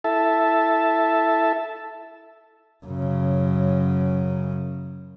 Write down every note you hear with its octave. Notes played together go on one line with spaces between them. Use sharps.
E4 A4 E5 A5
F#2 C#3